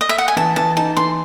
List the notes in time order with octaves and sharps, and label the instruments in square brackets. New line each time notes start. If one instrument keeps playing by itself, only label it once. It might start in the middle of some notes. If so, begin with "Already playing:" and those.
[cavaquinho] D#5
E5
F#5
G#5
[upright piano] E3 [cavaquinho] A5
[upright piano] E3 [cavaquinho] A5
[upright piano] D#4 [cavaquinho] A5
[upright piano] E3 [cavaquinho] C6